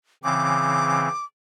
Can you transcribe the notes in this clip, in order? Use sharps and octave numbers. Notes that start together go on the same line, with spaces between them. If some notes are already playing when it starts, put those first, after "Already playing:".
C#3 E3 C4 D6